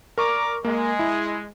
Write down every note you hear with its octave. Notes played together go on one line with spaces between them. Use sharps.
A#4 D5 A#5 C#6 D6
G#3 A#3
E4